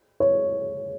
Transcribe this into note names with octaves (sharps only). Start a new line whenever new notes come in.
C#5